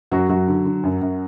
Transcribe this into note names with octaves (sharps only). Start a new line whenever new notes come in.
F#2 F#3 F#4
F#2 F#3 F#4
D3
D3
F#2
F#2